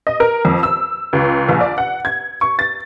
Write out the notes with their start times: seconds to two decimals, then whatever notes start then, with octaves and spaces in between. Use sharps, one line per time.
0.07 D#5
0.20 A#4
0.45 F2
0.63 E6
1.13 C#2
1.49 A#1
1.61 D5
1.78 F#5
2.05 G#6
2.41 C#6
2.59 A6